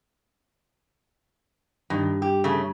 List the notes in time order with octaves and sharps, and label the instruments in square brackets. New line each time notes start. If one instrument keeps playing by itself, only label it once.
[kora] G2 [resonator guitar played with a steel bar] D#3
[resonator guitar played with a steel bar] G4
C#3 A3